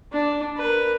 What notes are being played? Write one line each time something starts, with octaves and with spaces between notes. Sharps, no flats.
D4
A#4 B4